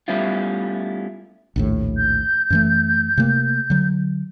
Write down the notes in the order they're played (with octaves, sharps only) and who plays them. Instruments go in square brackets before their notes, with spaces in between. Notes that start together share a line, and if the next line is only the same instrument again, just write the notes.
[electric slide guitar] G3 A3 B3 C#4 E4 F4
[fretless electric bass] A#1 D#2 A2
[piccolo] G6
[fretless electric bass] F#2 E3 A3
C3 A3 A#3
D3 F#3